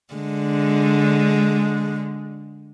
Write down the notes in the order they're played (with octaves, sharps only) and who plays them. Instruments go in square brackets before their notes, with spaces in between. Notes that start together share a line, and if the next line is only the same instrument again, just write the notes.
[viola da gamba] D3 G#3